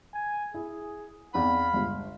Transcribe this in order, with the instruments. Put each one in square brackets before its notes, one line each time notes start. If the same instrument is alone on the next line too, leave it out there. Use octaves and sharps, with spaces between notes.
[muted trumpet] G#5
[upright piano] E4 [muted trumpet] G#4
[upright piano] E2 C4 D#4 [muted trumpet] F5 [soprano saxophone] B5
[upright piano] G1 C#2